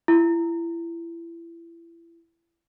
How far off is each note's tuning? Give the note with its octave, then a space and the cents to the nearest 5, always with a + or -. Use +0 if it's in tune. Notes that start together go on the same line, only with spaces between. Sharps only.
E4 +30